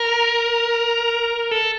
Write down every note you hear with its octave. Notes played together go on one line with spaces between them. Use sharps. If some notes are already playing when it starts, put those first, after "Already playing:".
Already playing: A#4
A4